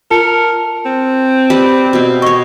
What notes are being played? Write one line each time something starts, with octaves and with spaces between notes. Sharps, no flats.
F4 A#4 A5 C#7
C4
G4 B4 D5
B2 E4
C#5 D#5 C#6